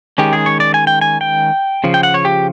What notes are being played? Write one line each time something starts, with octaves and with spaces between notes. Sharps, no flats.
D#3 G#3 C#4 G4
G#4
C#5
D5
G#5
G5
G#5
G5
C#3 F3
G5
F#5
C#5
G4